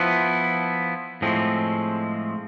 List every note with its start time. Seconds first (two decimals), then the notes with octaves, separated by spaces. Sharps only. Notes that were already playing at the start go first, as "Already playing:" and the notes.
Already playing: F3 B3 E4
1.22 A2 F3 G#3 C4